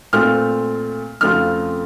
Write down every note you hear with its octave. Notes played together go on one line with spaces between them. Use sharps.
A#2 A3 C4 F4 F6
F2 C#3 A3 C4 F4 F6